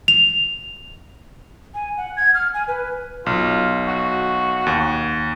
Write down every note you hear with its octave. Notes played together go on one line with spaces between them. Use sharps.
F7
G#5
F#5
G#6
F6
G#5
B4
B1 F4
F#4
D#2